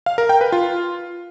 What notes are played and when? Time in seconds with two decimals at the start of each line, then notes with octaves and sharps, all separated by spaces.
0.06 F5
0.18 A#4
0.29 G5
0.41 B4
0.52 F4